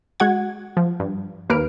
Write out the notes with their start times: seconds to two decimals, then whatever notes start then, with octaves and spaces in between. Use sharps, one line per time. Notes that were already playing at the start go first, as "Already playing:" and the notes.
0.20 G#3 F#4 F#5 G#6
0.77 F3
1.00 G2
1.50 D#2 A#3 B4 F6 D7